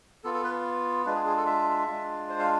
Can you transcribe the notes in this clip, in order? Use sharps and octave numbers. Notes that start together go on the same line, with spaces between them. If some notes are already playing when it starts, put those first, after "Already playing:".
B3 F4 A4
A4
B4
G#3 D4 F4 B4
G#4
G#4
A4
E5
G#3 D4 F4
C5
F5